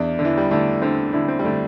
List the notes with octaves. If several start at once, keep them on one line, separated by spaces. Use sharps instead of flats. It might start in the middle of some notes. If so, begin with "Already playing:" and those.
Already playing: E2 D4
D3
E3
G3
D3 A3
D3 C4
D3 E4
C4
G3
D3 A3